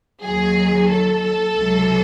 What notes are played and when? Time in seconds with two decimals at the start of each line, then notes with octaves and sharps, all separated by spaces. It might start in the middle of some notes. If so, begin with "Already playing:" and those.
0.23 D#2 D#3 F#3 G#4
0.89 A4
1.55 C#2 C3 F#3